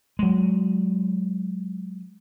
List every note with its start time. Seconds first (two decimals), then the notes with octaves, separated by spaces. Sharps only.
0.19 F#3 G#3